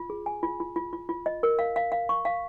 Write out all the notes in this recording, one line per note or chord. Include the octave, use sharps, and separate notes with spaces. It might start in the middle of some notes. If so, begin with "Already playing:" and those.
Already playing: F4
G#4
G#5
F4
F4
F4
F4
F4
D#5
A#4
F5
F5
F5
C#6
F5